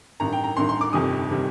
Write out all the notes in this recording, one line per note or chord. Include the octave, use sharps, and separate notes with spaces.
A1 G2 D#3 A#5
G5
A#5
A1 G2 D#3 C6
C6
D6
G1 F2 C3 D#3 G3 D#6
C3 D#3 G3